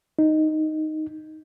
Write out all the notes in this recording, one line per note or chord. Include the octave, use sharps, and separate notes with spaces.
D#4